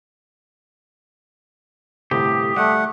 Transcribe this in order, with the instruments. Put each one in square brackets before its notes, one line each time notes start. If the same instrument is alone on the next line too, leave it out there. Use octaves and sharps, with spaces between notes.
[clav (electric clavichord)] G1 A2 C3 [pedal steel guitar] G4 [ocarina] D#6
[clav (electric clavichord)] G3 [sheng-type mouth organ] A3 F#5